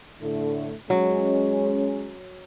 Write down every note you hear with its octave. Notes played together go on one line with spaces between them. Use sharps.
A2 D3 A3
F#3 G#3 C#4